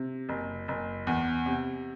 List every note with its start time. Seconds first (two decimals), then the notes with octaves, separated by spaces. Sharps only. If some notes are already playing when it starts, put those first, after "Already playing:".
Already playing: C3
0.29 F#1
0.68 F#1
1.07 E2
1.46 C3